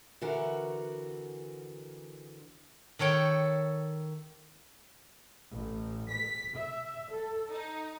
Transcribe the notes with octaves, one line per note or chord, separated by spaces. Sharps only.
D3 E3 F#4 A#4
D#3 A4 C#5 G5
A1
B6
E5
A4
D#4